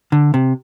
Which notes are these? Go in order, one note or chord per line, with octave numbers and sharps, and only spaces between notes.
D3
C3